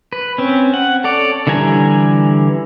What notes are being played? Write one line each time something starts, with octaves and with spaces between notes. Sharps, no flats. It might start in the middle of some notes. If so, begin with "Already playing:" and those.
B4
C4 C#4
F#5
A4 C#5 D5
D3 E3 G3 G#5 A#5